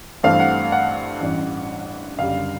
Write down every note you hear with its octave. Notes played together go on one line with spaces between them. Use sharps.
G2 E3 A3 C4 F5
F#5
F#5
A1 G2 E3
F#1 F#2 D3 G3 F5